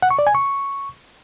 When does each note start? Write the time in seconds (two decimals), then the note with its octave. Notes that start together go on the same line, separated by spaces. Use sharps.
0.02 F#5
0.11 C#6
0.19 D5
0.27 G#5
0.35 C#6